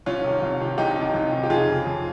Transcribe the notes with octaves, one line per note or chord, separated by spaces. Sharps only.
C2 C#4 F4
C3 D#3
C2
C3 D#3
C2 D#4 G4
C3 D#3
C2
C3 D#3
G4
F2 F4 G#4
C#3
F2